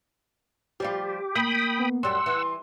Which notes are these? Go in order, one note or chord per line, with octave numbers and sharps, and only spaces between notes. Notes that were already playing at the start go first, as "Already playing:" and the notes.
F3 G3 F4 G4
A#3 G5 B5 D#6
B3
F#2 G3 F#5 C6 E6
E3